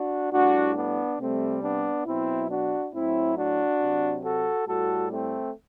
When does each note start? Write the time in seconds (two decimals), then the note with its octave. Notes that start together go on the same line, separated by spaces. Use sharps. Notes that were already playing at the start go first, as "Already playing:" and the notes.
Already playing: D4 F#4
0.33 A2 G3 D4 F#4
0.76 B3 D4
1.20 C3 G3 A3 C4
1.63 B3 D4
2.06 B2 F#3 C4 E4
2.50 D4 F#4
2.93 A2 F#3 C4 E4
3.37 D4 F#4
3.81 C3 F#3
4.24 F#4 A4
4.68 A2 G3 F#4 A4
5.12 A3 C4